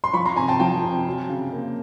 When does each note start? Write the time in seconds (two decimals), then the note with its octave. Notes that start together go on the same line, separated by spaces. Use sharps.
0.04 C6
0.13 F3 B5 C#6
0.25 A#5 C6
0.36 C3 G#5 A#5
0.48 G5 A5
0.60 F3 G5 A5
0.83 C3
1.06 F#3
1.29 C#3
1.52 A#3